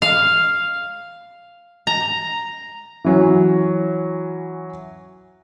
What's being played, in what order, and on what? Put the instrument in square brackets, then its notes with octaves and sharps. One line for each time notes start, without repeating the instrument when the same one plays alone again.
[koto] F5
A#5
[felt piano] E3 F#3 C#4